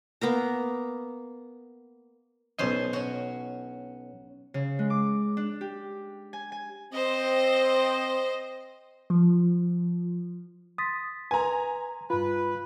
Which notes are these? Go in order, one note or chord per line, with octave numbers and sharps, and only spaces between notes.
A#3 B3 A#4 A#5
B1 C#4 C5 D#5 C6
C#4 F#4
C#3
G#3
D6
D4
G4
G#5
G#5
C4 C5 D#5
F3
C6 D#6 A6 B6
B4 G#5 A#5 C6
G2 F4 B4 B5